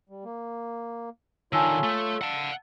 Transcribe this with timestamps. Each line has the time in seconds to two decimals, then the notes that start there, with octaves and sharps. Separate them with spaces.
0.09 G3
0.25 A#3
1.53 D3 D#3 F4 C#5 G#5 A5 E6
1.83 A3 E6
2.22 F5 F#5 A5